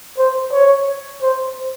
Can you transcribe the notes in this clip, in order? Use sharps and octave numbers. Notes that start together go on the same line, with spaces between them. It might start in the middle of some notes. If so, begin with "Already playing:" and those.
C5
C#5
C5